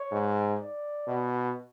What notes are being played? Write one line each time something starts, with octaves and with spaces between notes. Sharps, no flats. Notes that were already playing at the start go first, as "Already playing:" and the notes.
Already playing: C#5
G#2
D5
B2